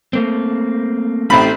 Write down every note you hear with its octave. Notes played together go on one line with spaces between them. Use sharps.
A3 A#3 C4
A1 A3 C4 D#4 A4 B5